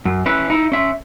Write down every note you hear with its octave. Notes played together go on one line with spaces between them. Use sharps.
F#2
C#4 E4 B4
D#4 E4
C#4 E5